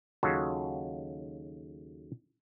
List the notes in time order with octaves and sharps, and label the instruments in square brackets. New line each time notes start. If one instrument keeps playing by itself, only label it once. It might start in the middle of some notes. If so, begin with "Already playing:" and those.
[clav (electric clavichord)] D#2 C#3 F#3 F4 F#4 A4